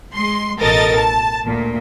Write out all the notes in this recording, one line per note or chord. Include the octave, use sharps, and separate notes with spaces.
G#3 C6
A1 B2 A4 A#4 D#5 A6
A5
D2 A#2